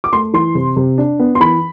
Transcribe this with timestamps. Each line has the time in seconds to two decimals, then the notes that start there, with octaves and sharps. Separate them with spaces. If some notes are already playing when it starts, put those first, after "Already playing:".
0.04 D6
0.13 A3 C6
0.33 E3 C6
0.55 C3
0.76 C3
0.98 D4
1.19 B3
1.35 C6
1.40 E3 B5